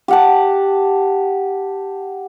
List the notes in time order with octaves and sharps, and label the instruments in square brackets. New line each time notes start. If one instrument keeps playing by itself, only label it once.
[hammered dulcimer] G4 F#5 A5